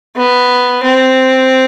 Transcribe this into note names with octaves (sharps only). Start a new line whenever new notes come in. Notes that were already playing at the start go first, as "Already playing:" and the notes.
B3
C4